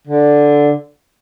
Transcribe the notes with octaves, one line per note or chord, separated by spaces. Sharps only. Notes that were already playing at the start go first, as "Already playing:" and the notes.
D3